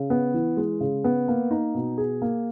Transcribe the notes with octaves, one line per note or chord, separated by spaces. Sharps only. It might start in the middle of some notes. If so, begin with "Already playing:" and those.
Already playing: C#3
B3
E3
G#3
C#3
B3
A#3
D#4
B2
G#4
A#3